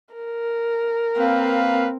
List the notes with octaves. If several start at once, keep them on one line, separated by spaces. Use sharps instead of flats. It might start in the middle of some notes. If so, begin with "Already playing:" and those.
A#4
A#3 C4 B4 F5